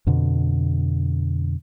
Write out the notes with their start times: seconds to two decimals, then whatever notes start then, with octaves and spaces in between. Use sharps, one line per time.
0.07 F2 B2 D3